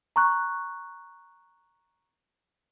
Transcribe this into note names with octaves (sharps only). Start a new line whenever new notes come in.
A#5 C#6 F#6